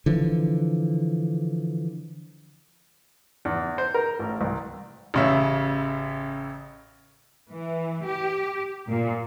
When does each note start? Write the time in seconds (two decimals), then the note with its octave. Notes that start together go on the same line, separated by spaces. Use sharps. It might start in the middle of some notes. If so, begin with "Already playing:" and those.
0.06 D3 E3 F3
3.45 E2
3.78 C5
3.94 A#4
4.19 A1
4.41 C2
5.14 A1 C#3 E5
7.52 E3
8.05 G4
8.87 A#2